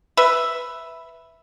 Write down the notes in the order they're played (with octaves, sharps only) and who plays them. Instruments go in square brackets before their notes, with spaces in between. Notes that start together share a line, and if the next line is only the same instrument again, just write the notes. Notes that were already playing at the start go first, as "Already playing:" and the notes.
[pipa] B4 E5